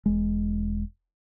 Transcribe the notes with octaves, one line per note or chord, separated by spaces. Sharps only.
E1 G#3